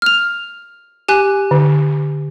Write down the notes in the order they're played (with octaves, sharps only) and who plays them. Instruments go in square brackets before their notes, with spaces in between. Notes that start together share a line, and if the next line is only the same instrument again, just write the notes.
[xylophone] F6 F7
G4 G#5 F#6
[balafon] D3